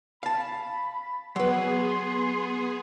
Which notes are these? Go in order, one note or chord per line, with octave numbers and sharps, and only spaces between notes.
F5 A5 B5
F#3 B3 G#4 B4 C6